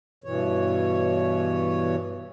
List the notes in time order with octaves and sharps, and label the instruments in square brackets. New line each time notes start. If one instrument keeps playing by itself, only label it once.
[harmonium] G2 B2 E3 C#5